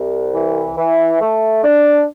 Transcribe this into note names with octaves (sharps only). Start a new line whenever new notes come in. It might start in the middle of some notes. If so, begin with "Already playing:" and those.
Already playing: C2
E3
E3
A3
D4